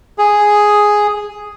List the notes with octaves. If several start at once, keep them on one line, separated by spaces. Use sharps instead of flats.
G#4